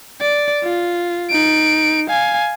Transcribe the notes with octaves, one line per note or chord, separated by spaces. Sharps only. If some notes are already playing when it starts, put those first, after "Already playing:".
D5
F4
D#4 D7
F5 G#5